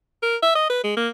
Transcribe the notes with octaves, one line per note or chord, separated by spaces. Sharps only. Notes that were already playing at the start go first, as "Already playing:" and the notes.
A#4
E5
D#5
B4
G#3
A#3